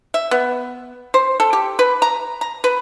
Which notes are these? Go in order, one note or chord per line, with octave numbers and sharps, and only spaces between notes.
E5
B3
C5
A4
G4
B4
A#5
A#5
B4